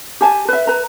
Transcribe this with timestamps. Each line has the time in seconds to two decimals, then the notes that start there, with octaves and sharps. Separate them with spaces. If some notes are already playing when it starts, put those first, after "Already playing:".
0.21 G4 G#5 A5
0.48 B4 E5
0.67 B4 A#5